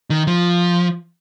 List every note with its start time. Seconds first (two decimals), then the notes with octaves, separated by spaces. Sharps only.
0.10 D#3
0.27 F3